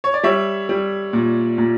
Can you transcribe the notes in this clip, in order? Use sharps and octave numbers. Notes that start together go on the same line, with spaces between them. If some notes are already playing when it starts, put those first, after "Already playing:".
C#5
D5
G3 C#5 E5
G3
A#2
A#2